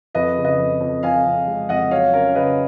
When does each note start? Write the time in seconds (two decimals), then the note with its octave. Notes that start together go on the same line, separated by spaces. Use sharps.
0.15 F2 B4 D#5
0.37 C#3
0.44 B4 D#5
0.59 F2
0.80 F2
1.03 F2 F5 G#5
1.25 F2
1.47 G#3
1.69 F2 D#5 F#5
1.91 F#3 C#5 F5
2.13 C#4 A#4 C#5
2.35 C#3 B4 D#5